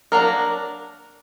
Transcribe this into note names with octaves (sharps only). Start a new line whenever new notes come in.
F#3 A#3 D4 A#4